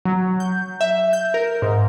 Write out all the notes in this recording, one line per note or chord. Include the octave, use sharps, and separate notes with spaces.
F#3
G6
E5
G6
A#4
G#2